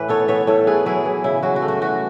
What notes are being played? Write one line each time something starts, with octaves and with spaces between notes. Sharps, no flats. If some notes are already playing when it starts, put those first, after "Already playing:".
Already playing: A2 E3 B4 E5
B3 A4 C#5
B3 C#5 E5
A2 A4 C#5
E4 G#4 B4
F#3 E4 G#4
E3
C#3 E4
F#3 F#4
F#4
A3
F#4
E3 F#4